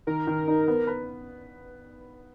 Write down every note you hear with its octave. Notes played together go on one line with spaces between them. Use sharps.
D#3 A#4
D#3
D#4
B3
B4